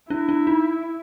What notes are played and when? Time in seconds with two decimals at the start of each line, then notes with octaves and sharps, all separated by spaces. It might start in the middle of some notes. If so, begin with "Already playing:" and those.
0.10 D4 E4
0.29 D4
0.47 D#4